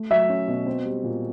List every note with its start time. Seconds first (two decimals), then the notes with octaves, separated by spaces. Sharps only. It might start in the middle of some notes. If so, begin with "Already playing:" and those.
Already playing: A3
0.10 F#3 E5
0.29 C#4
0.48 B2
0.66 C4
0.85 G3
1.04 A#2